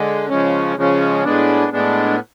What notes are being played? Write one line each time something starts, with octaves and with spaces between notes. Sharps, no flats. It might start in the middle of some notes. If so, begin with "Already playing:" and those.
Already playing: D3 G#3
C#3 F3 G#3 C#4
C#3 F3 G#3 C#4
A2 G#3 B3 D4
A2 G#3 B3 D4